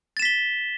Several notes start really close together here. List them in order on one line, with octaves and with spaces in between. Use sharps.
A6 E7 B6 G7